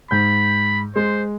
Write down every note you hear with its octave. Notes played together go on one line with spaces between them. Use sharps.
G#2 B5 G6
G#3 C5